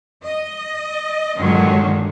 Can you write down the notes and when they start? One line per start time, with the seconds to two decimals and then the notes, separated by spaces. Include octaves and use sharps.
0.23 D#5
1.37 G2 A#2 D3 D#3 F#3 G#3